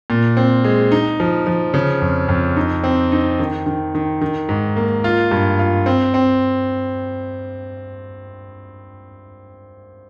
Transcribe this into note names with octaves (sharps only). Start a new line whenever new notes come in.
A#2
C4
G#3
D#4
F3
F3
C#3
F2
F2
D#4
C4
D#4
D#3
D#3
D#3
D#3
G#2
A#3
F4
G2
F4
C4
C4